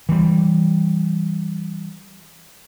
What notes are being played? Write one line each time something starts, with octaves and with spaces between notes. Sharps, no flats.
E3 G3